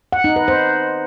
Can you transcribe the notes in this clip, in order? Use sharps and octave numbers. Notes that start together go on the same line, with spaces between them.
F#5
D#4
B4
C5